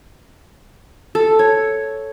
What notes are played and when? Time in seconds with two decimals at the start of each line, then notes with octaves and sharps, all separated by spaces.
1.15 A4
1.39 C#5